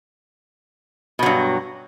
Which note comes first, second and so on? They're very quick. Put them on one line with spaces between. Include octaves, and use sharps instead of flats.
B2 F#3 G2